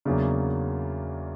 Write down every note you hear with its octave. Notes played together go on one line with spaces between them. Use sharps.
E2 C#3 F#3 A#3 D4